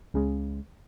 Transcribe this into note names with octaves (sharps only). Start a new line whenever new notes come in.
C#2 C#3 G#3